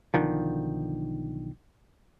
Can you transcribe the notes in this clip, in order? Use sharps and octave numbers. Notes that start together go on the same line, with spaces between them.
B1 D3 D#3 F3